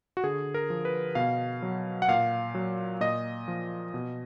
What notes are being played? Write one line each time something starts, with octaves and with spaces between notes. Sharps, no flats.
F#4
D3 G#4
A#4
F3
B4
B2 F5
F#3
F#5
A#2 F5
F#3
A#2 D#5
F3
B2